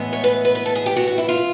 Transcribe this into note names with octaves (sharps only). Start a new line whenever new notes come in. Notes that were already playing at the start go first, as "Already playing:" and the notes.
Already playing: A2 E3 G#3 B3
C#5
B4
B4
B4
A4
G#4
G4
F#4
F#4
E4
F4